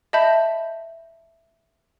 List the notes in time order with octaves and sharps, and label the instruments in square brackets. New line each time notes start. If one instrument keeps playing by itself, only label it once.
[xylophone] D#5 E5 A5 B5 G6